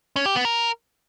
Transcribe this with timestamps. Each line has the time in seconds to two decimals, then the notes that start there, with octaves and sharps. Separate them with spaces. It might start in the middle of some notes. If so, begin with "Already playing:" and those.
0.16 C#4
0.26 G4
0.35 B3
0.45 A#4